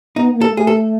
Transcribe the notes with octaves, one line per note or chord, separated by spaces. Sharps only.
B3 D#4
A#3
A4
A3
G#4
A4